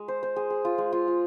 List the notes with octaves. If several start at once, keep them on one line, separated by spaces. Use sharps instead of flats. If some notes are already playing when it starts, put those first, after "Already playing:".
Already playing: G#3
C5
C5
G#4
G#4
F4
G#3
F4
F4